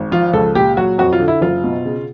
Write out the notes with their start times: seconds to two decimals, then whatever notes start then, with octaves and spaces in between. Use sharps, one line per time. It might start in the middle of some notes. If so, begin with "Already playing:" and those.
Already playing: G#1
0.12 F3 F4
0.33 C#2 A4
0.55 A#2 G4
0.77 F#3 F#4
0.98 F2 F#4
1.13 F4
1.20 D3
1.28 E4
1.42 F#1 F4
1.64 B2
1.85 C#3